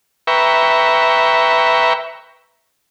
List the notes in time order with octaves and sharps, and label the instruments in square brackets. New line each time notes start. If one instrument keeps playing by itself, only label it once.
[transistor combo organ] B4 E5 G5 A#5 C#6